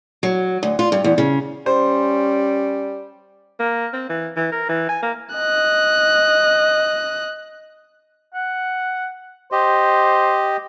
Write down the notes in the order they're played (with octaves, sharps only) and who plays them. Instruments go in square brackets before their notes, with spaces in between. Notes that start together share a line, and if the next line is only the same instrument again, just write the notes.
[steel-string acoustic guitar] F#3
D2
F4
G2
E2
C#3
[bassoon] G3 [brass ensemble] C#4 [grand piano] C5
[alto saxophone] A#3
C4
E3
E3
A#4
E3
G#5
A#3
[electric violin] D#5 F#6
[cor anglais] F#5
[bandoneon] G4 D#5 [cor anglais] C5